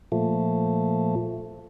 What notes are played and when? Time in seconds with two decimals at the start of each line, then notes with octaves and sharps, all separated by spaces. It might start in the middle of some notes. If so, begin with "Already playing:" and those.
0.12 A#2 F3 A3